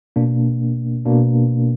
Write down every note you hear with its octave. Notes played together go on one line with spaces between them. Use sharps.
B2 A#3 D4
B2 A#3 D4